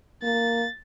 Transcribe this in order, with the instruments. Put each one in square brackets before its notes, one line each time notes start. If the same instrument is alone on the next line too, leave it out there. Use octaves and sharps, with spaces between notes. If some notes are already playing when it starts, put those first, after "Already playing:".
[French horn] A#3 [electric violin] A6